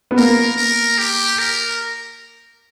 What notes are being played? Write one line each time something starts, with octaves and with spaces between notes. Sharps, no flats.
B3
A#3 A#4
A#4
G4
A#4